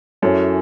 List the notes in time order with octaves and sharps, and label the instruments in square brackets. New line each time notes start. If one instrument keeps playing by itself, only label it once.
[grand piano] F#2 [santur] C#4 E4 A4